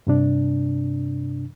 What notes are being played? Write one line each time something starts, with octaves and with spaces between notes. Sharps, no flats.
G2 C3 D4